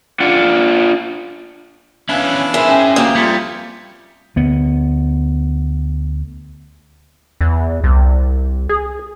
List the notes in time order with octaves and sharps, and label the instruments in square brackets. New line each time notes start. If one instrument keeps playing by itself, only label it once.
[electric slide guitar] D4 F4 D5 F#5
[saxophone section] E3 B3 D4 [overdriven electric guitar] C#4 B4 [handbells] E5 F5
[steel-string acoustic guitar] E4 [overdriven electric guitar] G#4 C5 [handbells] A#4 E5 G#5
[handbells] C#4 G5 G#5
[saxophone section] D2 [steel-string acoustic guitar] A#3 G4 [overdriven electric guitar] D4 C5 [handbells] D#6
[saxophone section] F2 F3 [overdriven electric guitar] G3 [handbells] G#6 B6 C#7
[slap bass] D2 B3
[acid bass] E2
C2
G#4